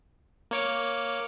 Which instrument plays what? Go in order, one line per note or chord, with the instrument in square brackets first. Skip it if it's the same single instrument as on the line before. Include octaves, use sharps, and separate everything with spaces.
[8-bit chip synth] A#3 C#5 D6